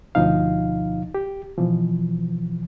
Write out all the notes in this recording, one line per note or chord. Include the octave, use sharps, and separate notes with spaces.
D2 B2 F3 D#4 F5
G4
B2 E3 F3